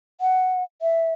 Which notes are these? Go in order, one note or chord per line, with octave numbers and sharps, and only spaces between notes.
F#5
E5